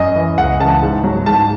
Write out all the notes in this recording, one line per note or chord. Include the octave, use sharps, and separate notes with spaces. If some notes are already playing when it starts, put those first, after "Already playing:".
Already playing: F#2 D#5
E3
C#2 F#5
C#3 E3 A5
G#2
F#3
G#2 A5